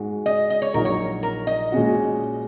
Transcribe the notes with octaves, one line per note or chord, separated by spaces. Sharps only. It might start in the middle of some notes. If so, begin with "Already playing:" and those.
Already playing: G#2 G#3 F#4
D#5
D#5
C#5
A#1 A#2 F#3 D#4 A#4
C#5
A#4
D#5
A#2 G#3 C#4 F#4